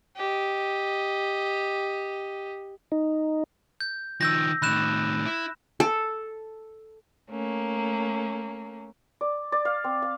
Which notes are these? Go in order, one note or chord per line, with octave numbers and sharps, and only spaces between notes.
G4 D#5
D#4
G6
D#3 F3 E6 G6 A#6
A2 D#3 B5 F#6 E7
E4
A4
A3 A#3 C#4
D5
D5
F5
C4
F5